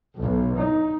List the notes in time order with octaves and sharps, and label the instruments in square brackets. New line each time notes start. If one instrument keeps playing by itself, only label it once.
[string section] B1
D#4